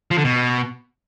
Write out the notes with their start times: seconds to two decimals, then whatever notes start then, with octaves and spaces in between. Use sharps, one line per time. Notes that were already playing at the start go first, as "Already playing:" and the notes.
0.11 F3
0.18 D3
0.24 B2